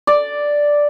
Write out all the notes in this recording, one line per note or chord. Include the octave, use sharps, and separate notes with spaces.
D5